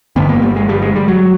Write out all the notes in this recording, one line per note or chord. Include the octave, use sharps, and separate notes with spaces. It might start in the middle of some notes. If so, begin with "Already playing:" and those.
G1 G2 D3 B3
A#3
G3
G#3
G3
G#3
G3
F#3